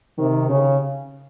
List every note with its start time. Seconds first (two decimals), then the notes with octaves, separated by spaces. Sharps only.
0.18 C3 D#3
0.49 C#3